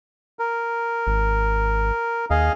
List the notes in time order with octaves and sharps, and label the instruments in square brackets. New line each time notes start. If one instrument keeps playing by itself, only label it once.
[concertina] A#4
[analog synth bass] G#1
[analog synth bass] D#2 [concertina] G#4 D#5 F5